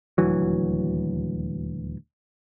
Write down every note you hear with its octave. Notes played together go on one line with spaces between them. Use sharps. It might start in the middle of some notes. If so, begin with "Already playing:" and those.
D#1 D2 E3 F#3